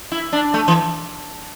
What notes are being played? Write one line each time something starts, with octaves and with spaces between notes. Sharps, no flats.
E4
D4
A3
E3